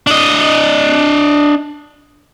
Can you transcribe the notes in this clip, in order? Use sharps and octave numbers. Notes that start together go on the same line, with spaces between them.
D4 D#5